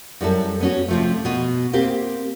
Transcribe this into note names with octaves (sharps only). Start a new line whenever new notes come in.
F#2 G3 E4 A4
B3 C#4 F#4
C3 F3 A3
B2
A#3 C4 G4